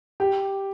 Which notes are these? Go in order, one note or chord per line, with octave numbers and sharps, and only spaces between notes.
G4